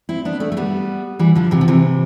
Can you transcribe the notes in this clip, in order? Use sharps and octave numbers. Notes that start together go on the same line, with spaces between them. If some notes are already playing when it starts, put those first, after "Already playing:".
C4 E4
B3 D4
A3 C4
A3
G3 B3
E3 G3
D3 F3
C3 E3
F3
C3 E3